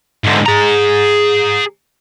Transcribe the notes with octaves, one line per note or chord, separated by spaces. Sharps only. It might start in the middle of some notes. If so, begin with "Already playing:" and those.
G#2 D3
G#4 A#5